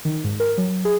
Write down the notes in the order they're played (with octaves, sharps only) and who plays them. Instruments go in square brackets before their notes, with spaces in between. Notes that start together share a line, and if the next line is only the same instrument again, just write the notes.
[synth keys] D#3
G#2
A#4
F#3
G#4